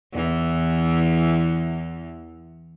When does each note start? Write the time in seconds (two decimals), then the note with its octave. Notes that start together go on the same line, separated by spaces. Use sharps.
0.13 E2 E3